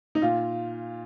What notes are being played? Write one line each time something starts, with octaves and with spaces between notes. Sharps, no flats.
D#4
A#2 F4